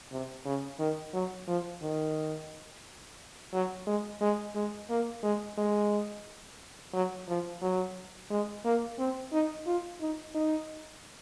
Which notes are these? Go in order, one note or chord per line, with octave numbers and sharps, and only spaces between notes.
C3
C#3
D#3
F#3
F3
D#3
F#3
G#3
G#3
G#3
A#3
G#3
G#3
F#3
F3
F#3
G#3
A#3
C4
D#4
F4
D#4
D#4